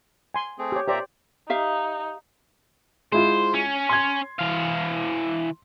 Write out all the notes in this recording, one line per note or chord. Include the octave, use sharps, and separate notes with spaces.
G#5 C6
A3 C4 G#4
G4 C#5
A#2 G4 C5 D5 E5 A#5
D#4 G4 E5 F5
G#3 E4 F4 C5
C#4
C6 G#6
E3 F5